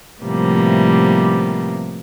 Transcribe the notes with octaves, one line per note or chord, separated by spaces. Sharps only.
A2 C3 F3 G3 A#3 B3